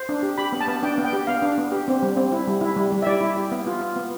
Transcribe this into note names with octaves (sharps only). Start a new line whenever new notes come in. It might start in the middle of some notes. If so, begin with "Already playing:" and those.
Already playing: C5
D4
G4
G4 B5
B3
A5
B3
D4 G5
B3
G5
G4
B3 F5
D4
B3
G4
C4
G3
C4
E4
G3
E4
G3
G3
E5
E4 D5
E4
G4
B3
F4
F4
B3